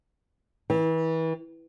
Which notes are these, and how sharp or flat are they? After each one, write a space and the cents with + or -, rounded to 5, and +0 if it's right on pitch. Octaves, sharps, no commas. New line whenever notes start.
E3 -30